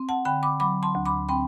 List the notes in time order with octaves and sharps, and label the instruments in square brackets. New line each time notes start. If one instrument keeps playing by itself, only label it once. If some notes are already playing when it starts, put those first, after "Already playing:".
Already playing: [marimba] C4
F#5 A5
D3 G5 B5
B5 D6
F#3 B5 D6
A5 C6
D2
B5 D6
C4 G5 B5